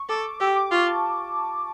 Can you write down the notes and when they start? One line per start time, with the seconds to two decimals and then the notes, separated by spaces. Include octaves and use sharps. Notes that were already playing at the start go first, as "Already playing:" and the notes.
Already playing: C#6
0.09 A4 D6
0.24 D6
0.40 G4 E6
0.56 D6
0.71 F4 C#6
0.87 A5